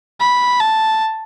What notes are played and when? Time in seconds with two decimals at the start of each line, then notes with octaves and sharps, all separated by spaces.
0.20 B5
0.60 A5